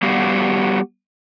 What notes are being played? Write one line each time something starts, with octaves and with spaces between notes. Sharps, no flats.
G3 B3 F#4 G4 F5